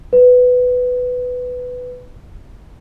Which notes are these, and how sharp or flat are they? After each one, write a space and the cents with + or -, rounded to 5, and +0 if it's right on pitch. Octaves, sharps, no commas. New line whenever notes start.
B4 +10